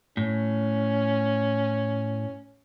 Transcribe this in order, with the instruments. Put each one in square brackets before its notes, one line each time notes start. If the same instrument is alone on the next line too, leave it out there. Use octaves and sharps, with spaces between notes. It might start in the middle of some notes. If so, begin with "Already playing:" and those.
[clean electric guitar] A2 [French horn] C#4